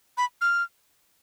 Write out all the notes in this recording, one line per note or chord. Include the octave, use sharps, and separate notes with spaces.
B5
F6